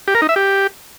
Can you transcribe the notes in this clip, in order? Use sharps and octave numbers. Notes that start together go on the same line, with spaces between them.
G4
A#4
D#4
E5
G4